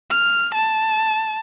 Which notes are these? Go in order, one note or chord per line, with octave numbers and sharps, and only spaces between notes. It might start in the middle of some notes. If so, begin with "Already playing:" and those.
F6
A5